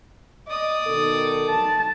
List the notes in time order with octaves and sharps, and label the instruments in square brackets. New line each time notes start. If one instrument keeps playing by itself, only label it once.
[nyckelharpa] D5 D#6 [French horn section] D#5
[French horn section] B2 D#3 A4
[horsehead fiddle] A5